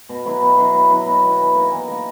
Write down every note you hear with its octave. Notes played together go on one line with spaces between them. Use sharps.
B2
F#3 B3 E4
B2
F#3 B3 E4
B2
F#3 B3 E4
B2
F#3 B3 E4
E3
A#3 D#4 A#4
E3
A#3 D#4 A#4